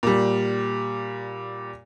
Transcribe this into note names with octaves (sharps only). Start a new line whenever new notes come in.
A#2 G3